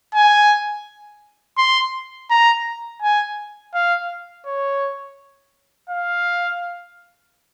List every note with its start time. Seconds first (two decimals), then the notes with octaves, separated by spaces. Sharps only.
0.15 G#5
1.58 C6
2.30 A#5
3.02 G#5
3.74 F5
4.46 C#5
5.90 F5